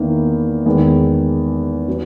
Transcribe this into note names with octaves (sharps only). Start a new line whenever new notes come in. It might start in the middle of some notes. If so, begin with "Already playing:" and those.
Already playing: E2 D#3 A#3 E4
E2 D#3 G#3
F#3 B3